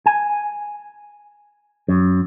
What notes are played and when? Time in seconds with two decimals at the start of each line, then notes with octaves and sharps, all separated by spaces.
0.06 G#5
1.88 F#2